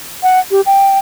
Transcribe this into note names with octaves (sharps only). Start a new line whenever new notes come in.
F#5
G4
G5